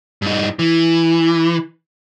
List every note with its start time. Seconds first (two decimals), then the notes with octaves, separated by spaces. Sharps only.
0.22 G2 D#4
0.59 E3